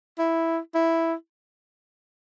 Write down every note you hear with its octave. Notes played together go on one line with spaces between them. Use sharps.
E4
E4